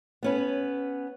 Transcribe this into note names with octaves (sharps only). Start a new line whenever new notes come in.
B3 C#4 B4